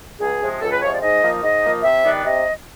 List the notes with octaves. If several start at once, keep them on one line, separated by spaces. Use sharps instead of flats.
C#2 G#4
C3 F3 G#3
C#2 A4
B4
C3 F3 G#3 C#5
D5
G#2 D#5
F3 A#3 D#4
G#2 D#5
F3 A#3 D#4
C3 E5
D#3 G3 B3 D4
C3 D#5